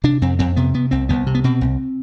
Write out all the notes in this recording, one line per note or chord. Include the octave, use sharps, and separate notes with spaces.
C3 D4
F2 C4
F2 C4
C3 B3
C3 B3
C2 C4
C2 B3
C3
B3
B2 C4
C2